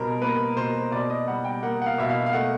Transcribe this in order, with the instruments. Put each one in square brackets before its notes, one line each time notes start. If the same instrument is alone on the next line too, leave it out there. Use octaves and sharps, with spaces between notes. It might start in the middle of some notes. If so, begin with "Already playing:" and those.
Already playing: [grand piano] B2 G3 A#4 C5
A#3 B4
B2 C5
B2 D5
D#5
G3 F#5
G5
A#3 F#5
F#5
F5
B2 E5
F5
F5
A3 F#5